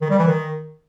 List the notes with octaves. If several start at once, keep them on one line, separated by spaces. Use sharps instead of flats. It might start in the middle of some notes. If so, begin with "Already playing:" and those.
D#3
G3
E3
D#3